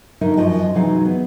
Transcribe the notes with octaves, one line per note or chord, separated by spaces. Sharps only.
D3 F#3 D#4 A#4 D#5 E5
F#2 F3 F#4 D#5 A5
C3 E3 F#3 D#4 G#4 F5
B3